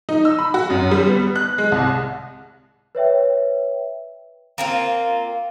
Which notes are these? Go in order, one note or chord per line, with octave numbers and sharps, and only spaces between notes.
D#4
E6
B5
F#4
F#2
G3
B3
F#6
G#3
C2
B4 C#5 E5 G5
A#3 C4 F4